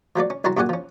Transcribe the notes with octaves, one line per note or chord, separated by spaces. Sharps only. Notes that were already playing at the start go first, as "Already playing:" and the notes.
F3 F#3 A3 D5
C#4
C2 F#3 F#4 A5 A#5 C6
F#2 A#2 F#4 G4 F#5 G#5
F3 C#4